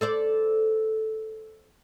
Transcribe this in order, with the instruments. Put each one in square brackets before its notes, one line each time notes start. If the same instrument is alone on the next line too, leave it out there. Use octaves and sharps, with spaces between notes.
[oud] A4 C5 D5